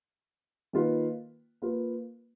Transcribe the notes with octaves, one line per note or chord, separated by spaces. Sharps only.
D#3 A#3 F4 B4
A#3 F4 B4